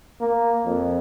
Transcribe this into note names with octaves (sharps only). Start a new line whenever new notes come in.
A#3
F2